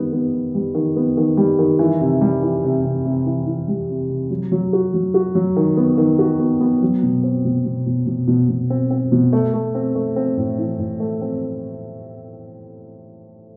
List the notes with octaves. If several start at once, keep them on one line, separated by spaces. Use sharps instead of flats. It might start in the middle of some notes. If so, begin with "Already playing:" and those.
Already playing: D#3 G3 B3
B3
D#3
G3
D#3
B3
D#3
G3
D#3
E3
C3
G3
E3
C3
C3
C3
E3
E3
G3
C3
C3
F#3
F#3
F#4
F#3
F#4
F#3
D#3
B3
D#3
F#4
B3
B3
F#3
B2
C4
B2
B2
B2
B2
B2
B2
C4
C4
B2
A3
A3
C4
A3
C4
A2
E3
A2
A3
C4